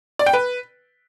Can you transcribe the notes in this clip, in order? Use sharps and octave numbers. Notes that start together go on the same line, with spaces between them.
D5
G5
B4